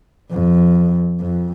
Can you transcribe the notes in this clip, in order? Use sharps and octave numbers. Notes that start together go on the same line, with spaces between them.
F2
F2